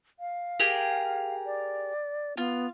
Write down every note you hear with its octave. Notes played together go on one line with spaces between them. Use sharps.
F5
G4 G#4 A#4
D5
B3 F4